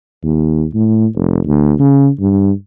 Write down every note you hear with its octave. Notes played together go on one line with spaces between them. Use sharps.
D#2
A2
F1
D2
C#3
G2